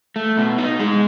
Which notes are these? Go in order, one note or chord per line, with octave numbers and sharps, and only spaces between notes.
A3
B2
D#4
G#3